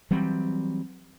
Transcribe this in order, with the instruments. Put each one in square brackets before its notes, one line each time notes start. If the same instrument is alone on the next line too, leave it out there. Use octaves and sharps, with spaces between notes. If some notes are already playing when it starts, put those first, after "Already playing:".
[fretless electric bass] E3 F#3 G3 C4